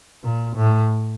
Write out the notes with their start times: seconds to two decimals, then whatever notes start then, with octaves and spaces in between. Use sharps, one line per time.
0.24 A#2
0.56 A2